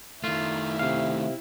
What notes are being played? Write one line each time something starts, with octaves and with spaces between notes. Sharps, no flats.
D#3 A3 E4 F4
C3 F5